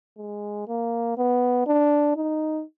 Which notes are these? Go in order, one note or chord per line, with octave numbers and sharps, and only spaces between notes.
G#3
A#3
B3
D4
D#4